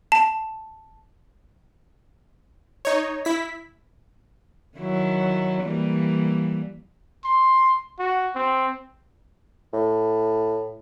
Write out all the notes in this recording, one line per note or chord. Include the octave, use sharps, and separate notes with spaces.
A5
D#4 C#5
E4 B6
D#3 F#3 E4
E3 G3 A#3
C6
F#4
C4
A2